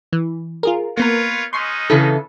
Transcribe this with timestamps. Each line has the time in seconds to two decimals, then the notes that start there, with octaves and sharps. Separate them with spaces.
0.13 E3
0.63 F4 G#4 A#4
0.97 A#3 B3 F4 A#4 B4 C#5
1.53 G#3 C#4 D#4 C6 C#6 C7
1.90 C#3 E3 A4